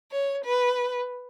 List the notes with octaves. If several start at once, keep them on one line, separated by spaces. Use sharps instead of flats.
C#5
B4